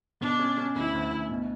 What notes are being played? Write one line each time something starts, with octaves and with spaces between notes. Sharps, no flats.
B2 D4
C#4
C#4
D2 E4
D2
D2
B2